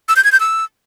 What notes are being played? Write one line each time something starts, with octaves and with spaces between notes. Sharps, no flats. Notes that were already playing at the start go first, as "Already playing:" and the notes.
E6
G6
G#6
G6
E6